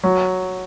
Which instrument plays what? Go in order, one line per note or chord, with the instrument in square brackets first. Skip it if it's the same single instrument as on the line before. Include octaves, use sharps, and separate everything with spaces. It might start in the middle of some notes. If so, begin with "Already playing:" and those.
[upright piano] F#3